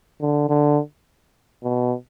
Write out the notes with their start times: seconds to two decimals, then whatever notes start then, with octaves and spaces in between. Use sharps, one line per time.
0.21 D3
0.49 D3
1.63 B2